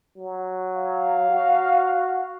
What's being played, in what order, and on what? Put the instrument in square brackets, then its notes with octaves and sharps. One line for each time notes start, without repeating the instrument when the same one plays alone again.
[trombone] F#3
[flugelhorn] F5
[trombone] F#4